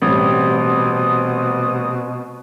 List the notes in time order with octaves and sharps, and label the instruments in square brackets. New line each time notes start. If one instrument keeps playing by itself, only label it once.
[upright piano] A1 G3 [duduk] B2 [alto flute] C4 [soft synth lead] D#6